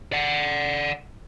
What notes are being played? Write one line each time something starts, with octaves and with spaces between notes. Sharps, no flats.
D5 F#5